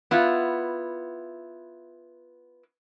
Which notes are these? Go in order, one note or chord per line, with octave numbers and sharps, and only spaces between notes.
B3 E4 F4